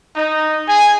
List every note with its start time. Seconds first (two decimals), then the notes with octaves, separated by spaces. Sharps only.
0.16 D#4
0.67 G#4 G#5